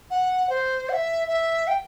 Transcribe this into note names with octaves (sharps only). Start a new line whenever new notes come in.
F#5
C5
F#5
E5
E5
G5